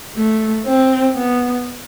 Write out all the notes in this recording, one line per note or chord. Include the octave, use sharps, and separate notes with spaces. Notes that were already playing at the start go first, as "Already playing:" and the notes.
A3
C4
B3